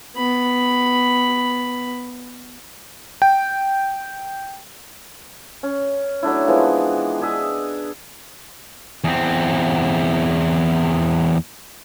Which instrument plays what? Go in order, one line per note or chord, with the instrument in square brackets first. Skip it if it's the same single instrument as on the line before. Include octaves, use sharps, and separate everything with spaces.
[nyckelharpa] B3 B5
[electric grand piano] G5
[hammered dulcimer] C#4
F#3 A3 D4 E4
E3 F3 G#3 B3
D4 G#4 D#5 E5
[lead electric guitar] E2 C4